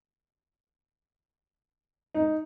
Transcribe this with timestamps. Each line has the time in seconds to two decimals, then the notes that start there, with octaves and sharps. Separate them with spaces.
2.15 D#4